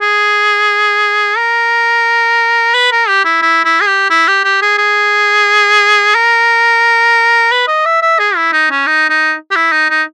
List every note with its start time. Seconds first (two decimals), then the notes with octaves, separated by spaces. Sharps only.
0.01 G#4
1.38 A#4
2.74 B4
2.92 A#4
3.08 G4
3.25 E4
3.42 E4
3.65 E4
3.81 G#4
3.87 G4
4.10 E4
4.28 G4
4.44 G4
4.62 G#4
4.78 G#4
6.15 A#4
7.51 B4
7.68 D#5
7.85 E5
8.02 E5
8.19 G#4
8.36 E4
8.53 D#4
8.71 C#4
8.87 D#4
9.10 D#4
9.51 G4
9.56 E4
9.72 D#4
9.90 D#4